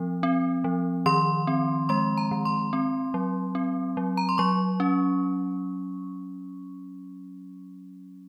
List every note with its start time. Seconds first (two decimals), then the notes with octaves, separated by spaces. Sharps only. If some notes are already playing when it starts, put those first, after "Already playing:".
Already playing: F3 C4
0.23 C4
0.64 F3
1.06 D#3 C6
1.47 C4
1.89 G#3 C6
2.17 A#5
2.31 D#3
2.45 C6
2.73 C4
3.14 F#3
3.55 C4
3.97 F#3
4.17 A#5
4.29 C6
4.38 F#3 C#6
4.80 C#4